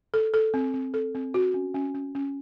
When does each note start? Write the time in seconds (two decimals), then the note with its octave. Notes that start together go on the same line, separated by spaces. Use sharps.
0.14 A4
0.34 A4
0.54 C4
0.74 C4
0.94 A4
1.15 C4
1.34 F#4
1.54 C#4
1.74 C#4
1.94 C#4
2.15 C#4